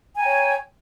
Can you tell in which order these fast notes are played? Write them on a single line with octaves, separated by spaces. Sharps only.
G#5 A#5 G5 C#5